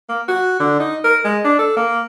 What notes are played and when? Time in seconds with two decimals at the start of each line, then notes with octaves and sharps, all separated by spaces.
0.09 A#3
0.28 F#4
0.59 D3
0.79 D#4
1.04 A#4
1.24 G#3
1.44 D4
1.59 A4
1.76 A#3